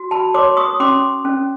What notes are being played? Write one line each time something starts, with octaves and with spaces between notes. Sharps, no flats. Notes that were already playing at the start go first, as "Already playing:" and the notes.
Already playing: F#4
A5 B5
C#5 C6 D6
C#6 D#6
C#4 C6 D6
C#4